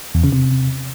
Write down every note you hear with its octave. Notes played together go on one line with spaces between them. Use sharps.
E2
C#3
C3